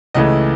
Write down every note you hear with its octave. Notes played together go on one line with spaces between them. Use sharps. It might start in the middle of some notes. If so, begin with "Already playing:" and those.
C#2 C#3 E3 A3 D#5